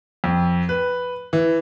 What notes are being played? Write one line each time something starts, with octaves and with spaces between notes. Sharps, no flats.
F2
B4
E3